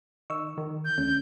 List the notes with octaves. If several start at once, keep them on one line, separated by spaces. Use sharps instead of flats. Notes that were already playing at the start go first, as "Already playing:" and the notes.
D#3 C#6 E6
D#3
G6
D2 C#4